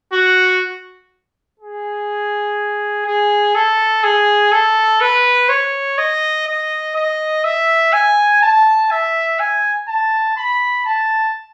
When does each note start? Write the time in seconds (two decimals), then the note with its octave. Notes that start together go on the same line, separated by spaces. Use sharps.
0.13 F#4
1.60 G#4
3.06 G#4
3.55 A4
4.04 G#4
4.52 A4
5.01 B4
5.49 C#5
5.98 D#5
6.47 D#5
6.95 D#5
7.44 E5
7.93 G#5
8.42 A5
8.91 E5
9.40 G#5
9.88 A5
10.37 B5
10.86 A5